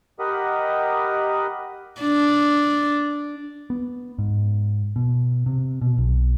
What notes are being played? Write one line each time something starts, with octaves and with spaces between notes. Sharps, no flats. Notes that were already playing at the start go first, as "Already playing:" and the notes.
G4 A#4 D#5 F#5 B5 D#6
D4
B3
G#2
B2
C3
B2
B1